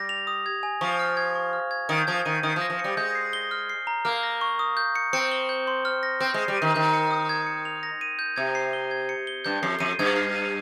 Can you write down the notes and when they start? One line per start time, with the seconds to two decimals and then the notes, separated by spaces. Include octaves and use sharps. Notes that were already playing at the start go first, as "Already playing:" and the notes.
Already playing: G3 A#6
0.09 F7
0.27 D#6
0.46 G#6
0.63 G#5
0.81 F3 C#6
0.99 F6
1.17 G#6
1.35 C#6
1.53 F6
1.71 G#6
1.89 D#3 D#6
2.07 F3 G#6
2.25 D#3 D#7
2.43 D#3 D#6
2.56 F3
2.61 A#6
2.70 F3
2.79 C#7
2.84 G3
2.97 G#3 G6
3.15 C7
3.33 G7
3.51 F6
3.70 C7
3.87 A#5
4.05 A#3 F6
4.23 A#6
4.41 C#6
4.59 D#6
4.77 G6
4.95 C#7
5.13 C4 C#7
5.32 G7
5.49 G6
5.67 C6
5.85 F6
6.03 A#6
6.20 C4 G6
6.34 G#3
6.39 C7
6.48 G3
6.57 D#3 D#7
6.74 D#3 G6
6.93 C#7
7.11 D#6
7.29 G#6
7.47 C#7
7.65 F7
7.83 A#6
8.01 D#7
8.19 G6
8.36 C3 G#6
8.55 C7
8.73 G7
8.91 G#6
9.09 C#7
9.27 G7
9.45 G2 G6
9.63 F2 C7
9.80 F2 D#7
9.99 G2 G#6
10.16 C7
10.36 D#7